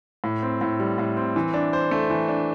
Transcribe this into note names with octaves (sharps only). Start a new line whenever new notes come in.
A2
C4
A2
G3
A2
C4
E3
D4
C5
A3
E3
D4